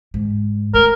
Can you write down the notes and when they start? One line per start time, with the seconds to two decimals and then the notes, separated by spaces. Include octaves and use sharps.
0.14 G#2
0.74 A3 A#4